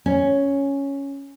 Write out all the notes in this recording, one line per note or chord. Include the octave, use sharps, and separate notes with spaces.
C#4